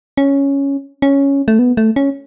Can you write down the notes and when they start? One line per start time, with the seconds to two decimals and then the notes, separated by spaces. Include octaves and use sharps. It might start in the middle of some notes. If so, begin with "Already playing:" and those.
0.17 C#4
1.02 C#4
1.48 A3
1.59 B3
1.77 A3
1.96 C#4